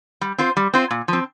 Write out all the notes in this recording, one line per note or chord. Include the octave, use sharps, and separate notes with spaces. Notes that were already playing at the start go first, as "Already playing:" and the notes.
G3
C4 F4 C5
G3
C4 F4 C5
A#2
F3 C4